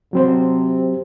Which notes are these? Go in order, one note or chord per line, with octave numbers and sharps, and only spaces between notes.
C3 F#3 C4 C5